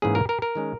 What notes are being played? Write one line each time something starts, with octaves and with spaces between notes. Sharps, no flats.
G#2 E3 A#3 C#4 G#4
A#4
A#4
A#4
D#3 G#3 C#4